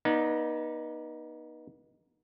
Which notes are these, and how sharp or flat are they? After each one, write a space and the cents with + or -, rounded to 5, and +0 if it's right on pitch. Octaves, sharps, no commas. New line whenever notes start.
B3 -35 D#4 +0 D5 +0